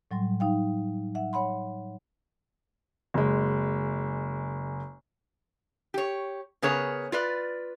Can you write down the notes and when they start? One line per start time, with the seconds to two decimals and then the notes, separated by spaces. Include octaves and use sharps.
0.11 A2 F#3 G3 C6
0.40 D#4 F5 G5
1.15 E5 F#5
1.33 C#5 F#5 B5 C6
3.14 F#1 G#3
5.94 G4 C#5
6.62 C#3 B3 G#4 A#4 C#5
7.12 F4 B4 D5